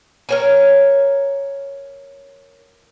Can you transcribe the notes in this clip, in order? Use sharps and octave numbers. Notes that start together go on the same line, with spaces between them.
A#4 C#5 G#5